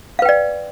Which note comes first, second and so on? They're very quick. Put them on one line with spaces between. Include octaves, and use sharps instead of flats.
F5 B4 G5 D5